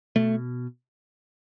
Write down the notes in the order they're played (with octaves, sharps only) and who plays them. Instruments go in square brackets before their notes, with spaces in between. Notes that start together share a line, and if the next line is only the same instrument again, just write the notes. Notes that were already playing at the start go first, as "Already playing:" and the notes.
[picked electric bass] B2 A3